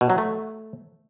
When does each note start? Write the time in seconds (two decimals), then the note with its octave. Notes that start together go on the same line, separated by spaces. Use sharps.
0.01 B2
0.10 F#3
0.18 A3